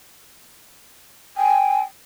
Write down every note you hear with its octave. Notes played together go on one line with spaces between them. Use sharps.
G5 G#5